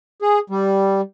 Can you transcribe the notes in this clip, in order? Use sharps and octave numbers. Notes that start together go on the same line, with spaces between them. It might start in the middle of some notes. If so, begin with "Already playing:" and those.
G#4
G3